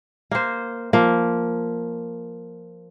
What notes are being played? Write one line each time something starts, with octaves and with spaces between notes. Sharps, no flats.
A#3 C5
F3 A#3